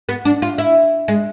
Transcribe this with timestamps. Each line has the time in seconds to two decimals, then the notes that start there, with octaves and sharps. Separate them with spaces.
0.09 B3
0.25 D4
0.42 F4
0.58 E4
1.08 G#3